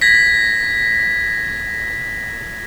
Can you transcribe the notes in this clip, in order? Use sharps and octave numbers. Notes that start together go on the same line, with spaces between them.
G#6 A#6 B6